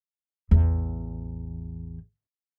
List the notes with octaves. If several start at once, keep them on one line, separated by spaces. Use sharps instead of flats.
A1 E2